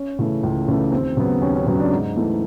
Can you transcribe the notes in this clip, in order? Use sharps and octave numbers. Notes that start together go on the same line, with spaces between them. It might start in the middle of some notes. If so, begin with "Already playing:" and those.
Already playing: C#4
C#3 E3 A3
C#2
C#3 E3 A3
D#2 C4
C#3 F#3 B3
D#2 C#4
C#4
C#3 F#3 B3 C#4
D4
G#2 D#4
E3 A3